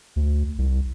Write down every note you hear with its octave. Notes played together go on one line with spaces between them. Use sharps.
D2
C2